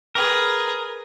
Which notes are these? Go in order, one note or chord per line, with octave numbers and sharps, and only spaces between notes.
G#4 A#4 B4